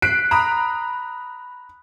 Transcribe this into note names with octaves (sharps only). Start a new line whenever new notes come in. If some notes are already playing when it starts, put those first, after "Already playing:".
F#6 B6 C7 D7
A#5 B5 D#6